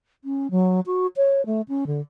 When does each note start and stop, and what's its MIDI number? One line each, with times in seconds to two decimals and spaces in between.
0.24 0.50 61
0.51 0.80 54
0.86 1.07 66
1.16 1.44 73
1.46 1.61 57
1.68 1.85 61
1.87 2.01 50